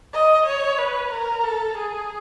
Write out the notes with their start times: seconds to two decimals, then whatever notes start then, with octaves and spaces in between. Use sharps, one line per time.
0.13 D#5
0.46 C#5
0.78 B4
1.11 A#4
1.44 A4
1.77 G#4